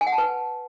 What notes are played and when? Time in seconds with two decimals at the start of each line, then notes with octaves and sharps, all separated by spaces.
0.01 G#5
0.07 F#5
0.12 A5
0.18 B4